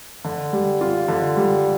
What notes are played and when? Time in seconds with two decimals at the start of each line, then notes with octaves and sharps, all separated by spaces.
0.24 D3
0.53 G3
0.81 F4
1.08 D3
1.37 G3